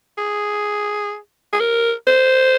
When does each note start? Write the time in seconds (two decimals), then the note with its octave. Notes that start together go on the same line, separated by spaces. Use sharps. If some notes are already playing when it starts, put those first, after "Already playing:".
0.18 G#4
1.53 G#4
1.60 A#4
2.07 C5